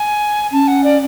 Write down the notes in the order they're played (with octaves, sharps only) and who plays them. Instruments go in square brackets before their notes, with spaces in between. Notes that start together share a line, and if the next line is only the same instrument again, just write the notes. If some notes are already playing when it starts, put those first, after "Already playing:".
Already playing: [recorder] G#5
[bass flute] C#4 [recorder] A5
[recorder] F#5
D5